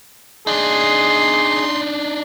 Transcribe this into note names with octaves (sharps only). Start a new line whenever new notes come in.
D4 D#4 G#4 C6